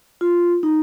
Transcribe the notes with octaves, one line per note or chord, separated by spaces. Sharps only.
F4
D#4